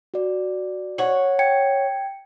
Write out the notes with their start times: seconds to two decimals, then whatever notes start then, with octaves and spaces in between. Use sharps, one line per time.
0.14 F#4 D5
0.98 C#5 F#5
1.39 G5 G#6 C#7